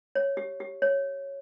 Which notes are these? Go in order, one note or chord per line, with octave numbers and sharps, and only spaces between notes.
C#5
G4
G4
C#5